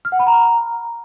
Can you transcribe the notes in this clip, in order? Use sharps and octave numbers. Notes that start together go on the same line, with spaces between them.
F6
F#5
B5
A#5